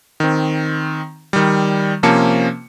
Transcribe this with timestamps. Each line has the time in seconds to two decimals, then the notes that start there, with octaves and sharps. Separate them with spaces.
0.20 D#3 C4
1.33 D#3 G3
2.03 C3 F3 A#3 C#4 A5 C#7